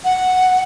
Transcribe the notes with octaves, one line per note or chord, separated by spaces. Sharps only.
F#5